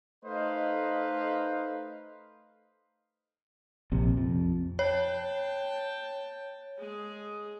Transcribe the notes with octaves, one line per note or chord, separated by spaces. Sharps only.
A3 D#4 B4 C5 D#5 F5
A#1 C3
F2
C#5 G5 A5
G#3 G#4